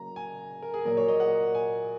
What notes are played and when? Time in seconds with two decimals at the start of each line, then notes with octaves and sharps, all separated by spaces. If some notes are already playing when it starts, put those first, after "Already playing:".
Already playing: C#3 F#3 A#3 A#5
0.16 G#5
0.63 A#4
0.74 G#4
0.85 A#2 F#3 A#3 A#4
0.97 C#5
1.08 D#5
1.20 F#5
1.55 G#5